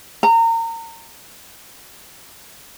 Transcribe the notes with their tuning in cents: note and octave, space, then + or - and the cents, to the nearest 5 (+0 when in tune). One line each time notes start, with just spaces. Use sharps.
A#5 -30